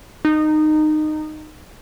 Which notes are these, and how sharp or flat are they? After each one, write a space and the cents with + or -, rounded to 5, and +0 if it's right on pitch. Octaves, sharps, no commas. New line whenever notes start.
D#4 -20